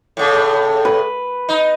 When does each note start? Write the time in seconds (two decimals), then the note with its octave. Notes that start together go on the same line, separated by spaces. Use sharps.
0.17 A2 C#3
0.85 B4
1.49 D#4